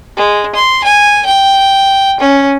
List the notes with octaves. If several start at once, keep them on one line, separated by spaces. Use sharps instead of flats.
G#3
C6
G#5
G5
C#4